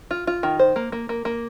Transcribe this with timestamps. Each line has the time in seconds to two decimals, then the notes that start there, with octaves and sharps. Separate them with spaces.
0.11 F4
0.27 F4
0.43 D#3
0.59 C5
0.76 A#3
0.92 A#3
1.09 A#3
1.25 A#3